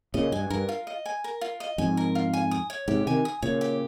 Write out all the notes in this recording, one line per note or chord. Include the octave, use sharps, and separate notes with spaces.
A#2 C#3 D#5
G2 G#5
G2 A#4
F4
D#5
G#5
A#4
F4
D#5
F2 G#2 G#5
A#4
F4
G#5
D#6
C#5
G#2 C3 G4
C3 D#3 G#5
D#6
A#2 C#3 C#5
G4